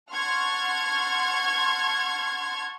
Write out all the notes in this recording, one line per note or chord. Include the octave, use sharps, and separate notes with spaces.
F#5 A5 C6 C#6 F6 G#6